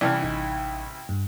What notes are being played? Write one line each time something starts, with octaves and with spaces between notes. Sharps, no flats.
C2 C#3 E3 D5 A5 F6
A1 D#4
G2